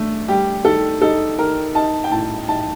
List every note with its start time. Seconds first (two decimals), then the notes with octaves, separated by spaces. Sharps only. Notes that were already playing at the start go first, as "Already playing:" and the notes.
Already playing: A3 D4
0.28 G3 G4
0.65 D#3 A4
1.02 D#4 A4
1.38 D#3 A#4
1.75 D#4 A5
2.04 G5
2.12 A2 A5
2.48 D#4 A5